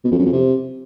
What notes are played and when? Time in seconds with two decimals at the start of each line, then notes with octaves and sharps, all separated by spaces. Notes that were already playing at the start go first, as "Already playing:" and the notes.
0.05 B2
0.12 F2
0.19 F#2
0.26 F2
0.33 C3